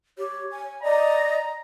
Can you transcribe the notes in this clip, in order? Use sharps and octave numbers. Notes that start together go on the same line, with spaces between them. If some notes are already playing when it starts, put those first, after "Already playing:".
G4 C#5
G#5
D5 D#5 A#5